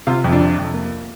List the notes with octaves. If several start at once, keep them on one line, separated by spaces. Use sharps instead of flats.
C3 F4 F5
F2
D4 D5
C3
F2
A#3